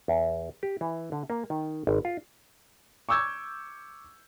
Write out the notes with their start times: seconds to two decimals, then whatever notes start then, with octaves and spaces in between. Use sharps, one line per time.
0.08 E2
0.63 G4
0.81 E3
1.12 D3
1.30 A#3
1.50 D#3
1.87 G#1
2.05 F4
3.09 C#6 D6 E6 G6 G#6